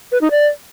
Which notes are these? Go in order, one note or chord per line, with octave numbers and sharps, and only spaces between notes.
B4
D#4
D5